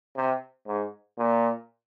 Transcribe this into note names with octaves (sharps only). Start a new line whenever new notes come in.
C3
G#2
A#2